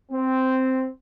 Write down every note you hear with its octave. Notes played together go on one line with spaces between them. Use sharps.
C4